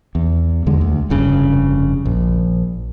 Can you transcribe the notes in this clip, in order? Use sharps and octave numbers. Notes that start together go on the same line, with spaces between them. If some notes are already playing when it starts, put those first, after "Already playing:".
E2
E2 D3 G#3
D2
F1 G2 C#3
A#1